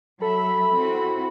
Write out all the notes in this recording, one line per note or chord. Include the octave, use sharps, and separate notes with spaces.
F#3 A4 E5 B5
C4 E4 F#4